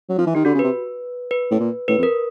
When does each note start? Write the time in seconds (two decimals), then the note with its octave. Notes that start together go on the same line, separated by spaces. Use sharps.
0.09 F#3
0.18 F3
0.27 E3
0.35 D#3 G4
0.45 D3 F#4
0.54 C#3
0.59 C3 B4
1.31 B4
1.51 A2
1.59 A#2
1.88 A2 B4
1.98 F2
2.03 A#4